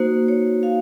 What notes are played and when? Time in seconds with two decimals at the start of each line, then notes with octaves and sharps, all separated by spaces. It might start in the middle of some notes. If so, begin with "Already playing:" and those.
Already playing: A#3 D#4 F#4 C5
0.28 C#5
0.63 F5